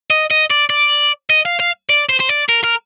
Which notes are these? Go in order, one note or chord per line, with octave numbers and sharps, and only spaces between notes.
D#5
D#5
D5
D5
D#5
F5
F5
D5
C5
C5
D5
A#4
A#4